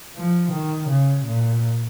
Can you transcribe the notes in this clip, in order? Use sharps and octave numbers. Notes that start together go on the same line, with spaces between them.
F3
D#3
C#3
A#2